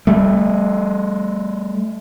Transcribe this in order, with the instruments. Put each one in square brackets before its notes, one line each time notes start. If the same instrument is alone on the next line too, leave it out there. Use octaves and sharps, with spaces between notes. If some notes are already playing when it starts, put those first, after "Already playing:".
[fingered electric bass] G3 A3